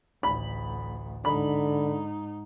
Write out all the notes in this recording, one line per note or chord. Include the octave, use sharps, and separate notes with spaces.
A1 D2 B5
G#2 D3 D#4 B5